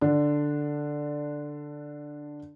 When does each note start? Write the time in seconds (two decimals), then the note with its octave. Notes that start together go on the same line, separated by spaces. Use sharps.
0.01 D3 D4